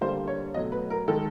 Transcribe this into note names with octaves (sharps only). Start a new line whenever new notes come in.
D3 G3 A#3 C5
C#5
B2 F#3 A3 D#5
B4
A#4
D#3 G#3 A4